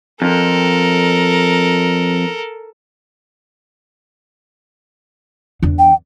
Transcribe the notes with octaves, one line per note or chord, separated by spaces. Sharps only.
F2 A4 A#4
E2 D4
G5